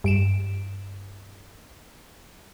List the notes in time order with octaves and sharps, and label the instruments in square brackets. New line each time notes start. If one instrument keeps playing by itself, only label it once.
[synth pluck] G2 D7 E7